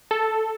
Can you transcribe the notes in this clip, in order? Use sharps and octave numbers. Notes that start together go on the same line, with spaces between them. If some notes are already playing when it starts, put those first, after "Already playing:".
A4